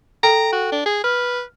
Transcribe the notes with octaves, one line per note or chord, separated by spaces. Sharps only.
A4 G5 A#5 D7
F#4
D4
G#4
B4 F6